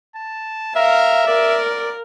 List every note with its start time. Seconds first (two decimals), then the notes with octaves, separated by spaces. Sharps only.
0.16 A5
0.76 A#4 E5 F5
1.27 A#4 D5